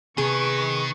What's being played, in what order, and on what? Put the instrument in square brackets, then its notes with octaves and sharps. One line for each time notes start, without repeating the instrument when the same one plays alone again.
[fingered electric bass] C3 B3 [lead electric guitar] D#3 [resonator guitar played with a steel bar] G#4 [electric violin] B4 C#6